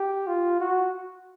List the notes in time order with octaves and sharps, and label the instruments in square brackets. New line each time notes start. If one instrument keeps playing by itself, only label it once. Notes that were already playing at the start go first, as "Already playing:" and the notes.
Already playing: [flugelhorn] G4
F4
F#4